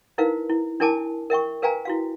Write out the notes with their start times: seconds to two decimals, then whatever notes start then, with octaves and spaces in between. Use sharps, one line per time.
0.18 D#4 E4 A#4 B4 F5
0.50 E4
0.80 D4 E4 A#4 G#5 A5 D6
1.30 A#4 E5 G5 C#6
1.62 A#4 B4 F5 G5 G#5 A#5
1.85 E4 F#4 F5